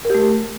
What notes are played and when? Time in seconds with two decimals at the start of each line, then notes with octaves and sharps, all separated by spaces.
0.05 A#4
0.10 G4
0.15 A3